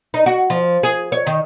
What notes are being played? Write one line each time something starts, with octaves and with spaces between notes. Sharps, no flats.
D#4
F#4
F3
G#4
C#5
D#3